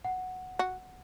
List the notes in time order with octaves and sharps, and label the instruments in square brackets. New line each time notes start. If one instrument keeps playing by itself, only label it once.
[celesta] F#5
[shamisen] F#4